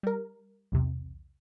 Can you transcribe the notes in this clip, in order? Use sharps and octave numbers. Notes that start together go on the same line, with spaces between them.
G3 A#4
B1 E2 C3